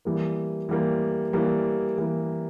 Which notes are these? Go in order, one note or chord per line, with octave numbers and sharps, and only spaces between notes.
E3 G3 A#3
E3 G3 A#3
E3 G3 A#3
E3 G3 A#3